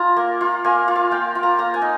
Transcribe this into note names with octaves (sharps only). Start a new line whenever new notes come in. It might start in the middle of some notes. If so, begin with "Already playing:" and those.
Already playing: F4 G#5 A#5
A#3
F4
A#3 G#5
F4
F5
A#3 G5
F4
A#5
A#3 A#5
G#5
D#4